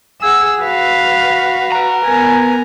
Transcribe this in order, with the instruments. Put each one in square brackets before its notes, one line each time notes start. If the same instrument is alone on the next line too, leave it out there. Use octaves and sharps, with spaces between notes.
[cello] G#4 [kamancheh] F#5 E6
[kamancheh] F#4 [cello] B4 F5
[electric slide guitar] B4 A#5
[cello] B3 A#4 [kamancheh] G#5